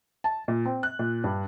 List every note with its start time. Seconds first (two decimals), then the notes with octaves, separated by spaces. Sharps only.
0.24 A5
0.48 A#2
0.66 C4
0.83 F#6
0.99 A#2
1.24 G2